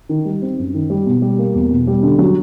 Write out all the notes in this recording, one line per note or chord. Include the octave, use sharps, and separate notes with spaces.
D#3
G3
C4
F#2
D#3
G3
B2
G3
A#3
E2
B2
G3
D3
F#3